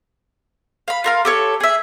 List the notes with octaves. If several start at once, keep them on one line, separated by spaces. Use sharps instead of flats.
F5 B5
F4 A#4 F5
G4 A4 C#5
G#4 E5